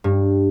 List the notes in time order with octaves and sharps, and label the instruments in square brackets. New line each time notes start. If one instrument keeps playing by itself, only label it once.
[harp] G2